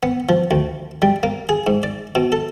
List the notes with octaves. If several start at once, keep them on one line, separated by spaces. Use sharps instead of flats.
B3
F3
D2
G3
A#3
G#4
G#2
D5
B2
A4